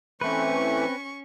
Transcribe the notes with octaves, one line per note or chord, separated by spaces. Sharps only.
E3 A3 C4 C#4 B4 C#6